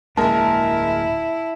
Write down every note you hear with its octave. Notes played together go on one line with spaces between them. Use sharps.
D1 G#3 A#3 D4 E4 A#4 A5